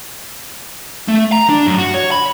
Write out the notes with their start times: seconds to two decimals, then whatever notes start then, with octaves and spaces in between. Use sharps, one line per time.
1.08 A3
1.32 A#5
1.49 D4
1.67 F#2
1.78 F#4
1.94 C#5
2.11 B5